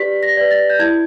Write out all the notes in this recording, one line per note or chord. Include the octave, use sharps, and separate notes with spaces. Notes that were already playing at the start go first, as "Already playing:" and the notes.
Already playing: G4 B4 D5 B6
A#6
B4 D5
A6
G6
E4 G#6